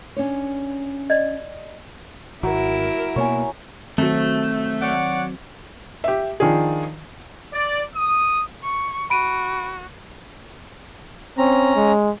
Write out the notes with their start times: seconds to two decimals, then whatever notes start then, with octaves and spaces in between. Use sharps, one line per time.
0.16 C#4 D4 C#5
1.10 D5 D#5
2.43 G#1 F#3 E4 A#4
3.16 B2 A#3 B3 C#5 G#5
3.98 D#3 F#3 A3 C4 F#4
4.81 C#5 D5 F#5
6.04 G4 E5
6.40 D#3 F3 D4 G#4
7.53 D5
7.95 D#6
8.63 C#6
9.10 F#4 B5 D7 D#7
11.38 C4 C#4 A#5
11.76 G#3